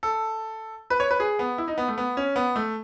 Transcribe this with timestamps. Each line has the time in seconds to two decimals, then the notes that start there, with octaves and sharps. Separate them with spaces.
0.03 A4
0.90 B4
1.00 C#5
1.11 B4
1.20 G#4
1.39 B3
1.58 E4
1.68 D#4
1.78 B3
1.88 A3
1.98 B3
2.17 C#4
2.36 B3
2.56 A3